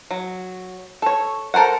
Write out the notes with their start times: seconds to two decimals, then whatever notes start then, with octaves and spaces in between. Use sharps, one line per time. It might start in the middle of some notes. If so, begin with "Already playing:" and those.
0.11 F#3
1.02 A4 C#5
1.54 A4 A#4 C5 F#5